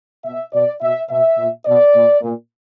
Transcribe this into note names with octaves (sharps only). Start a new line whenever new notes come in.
B2 E5
B2 D5
B2 E5
B2 E5
A#2
B2 D5
A#2
A#2